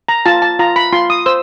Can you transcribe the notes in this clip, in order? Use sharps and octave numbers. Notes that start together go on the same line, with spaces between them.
A#5
F4 A5
A5
F4 A#5
B5
F4 C6
D#6
C5 E6